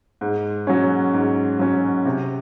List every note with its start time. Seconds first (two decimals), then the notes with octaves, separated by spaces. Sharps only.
0.21 G#2
0.67 F#3 C#4
1.14 G#2
1.59 F#3 C#4
2.05 C3